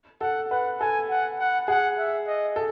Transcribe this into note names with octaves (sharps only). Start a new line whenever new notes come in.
A4 F#5
B4 F#5
A4 G#5
F#5
F#5
G#4 F#5
E5
D#5
A4